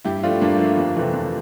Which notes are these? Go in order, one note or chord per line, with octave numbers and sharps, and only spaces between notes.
G2 E4 G4
F3 A3 D4 F4
G2 A#3 D4
F3 A3
F2
C3 E3 A3
F2